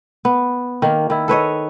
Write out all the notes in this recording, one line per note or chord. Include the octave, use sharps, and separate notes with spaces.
B3
D#3 A#3
D#3 E4
A4 B4 C#5 D#5